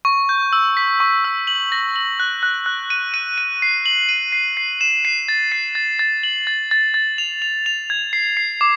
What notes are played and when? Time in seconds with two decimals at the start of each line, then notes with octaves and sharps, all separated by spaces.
0.05 C#6
0.29 G6
0.53 E6
0.77 B6
1.00 C#6
1.25 E6
1.47 F#7
1.72 A#6
1.96 F#7
2.20 F#6
2.43 F#6
2.66 F#6
2.90 D#7
3.14 D#7
3.38 D#7
3.62 C7
3.86 F#7
4.09 D#7
4.32 C7
4.57 C7
4.81 E7
5.05 C7
5.29 A6
5.52 C7
5.75 A6
5.99 A6
6.23 F#7
6.47 A6
6.71 A6
6.94 A6
7.18 F7
7.42 F7
7.66 F7
7.90 G#6
8.13 C7
8.37 C7
8.61 D6